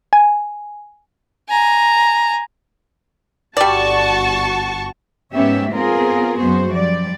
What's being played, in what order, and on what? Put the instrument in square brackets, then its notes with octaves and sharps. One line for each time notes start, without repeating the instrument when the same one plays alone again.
[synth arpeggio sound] G#5
[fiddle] G#5 A#5
[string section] G1 F#4 C#6 [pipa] G3 D5 [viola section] A5
[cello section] G#2 B3 C#4 G4 C#5 E5
B3 C4 F4 G#4 A#4
F#2 B3 F#4 C5
F3 G3 D5